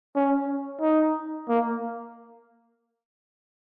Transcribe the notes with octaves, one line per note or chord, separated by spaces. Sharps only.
C#4
D#4
A#3